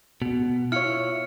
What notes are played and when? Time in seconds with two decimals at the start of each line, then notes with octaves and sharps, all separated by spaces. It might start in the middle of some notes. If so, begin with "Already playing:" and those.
0.22 B2
0.72 E4 F4 C#5 F6 C#7